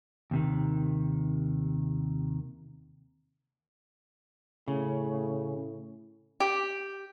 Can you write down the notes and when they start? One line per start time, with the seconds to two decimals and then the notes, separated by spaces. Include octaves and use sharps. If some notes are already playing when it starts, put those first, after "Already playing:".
0.31 D#2 C3 D#3
4.68 A2 C#3
6.40 G4